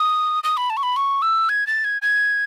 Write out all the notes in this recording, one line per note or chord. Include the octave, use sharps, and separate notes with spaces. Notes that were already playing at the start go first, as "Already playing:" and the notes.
Already playing: D#6
D#6
B5
A5
C#6
B5
C#6
E6
G#6
A6
G#6
G#6